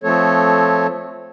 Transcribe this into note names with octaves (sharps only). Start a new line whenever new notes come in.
F3 A3 C4 A4 C#5